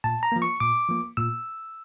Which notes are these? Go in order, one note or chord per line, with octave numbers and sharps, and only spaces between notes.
A#2 A5
A#5
F3 A#3
C#6
A#2 D6
F3 A#3
A#2 E6